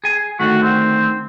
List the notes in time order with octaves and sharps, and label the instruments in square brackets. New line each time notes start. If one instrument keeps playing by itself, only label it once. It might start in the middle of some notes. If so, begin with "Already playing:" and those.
[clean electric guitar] G#4 G#5
[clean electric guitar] D3 D#3 A3 [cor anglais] F#4
[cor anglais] C4